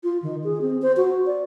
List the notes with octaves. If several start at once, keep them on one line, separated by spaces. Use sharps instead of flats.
F4
D#3
G#4
C4
C5
F#4
D5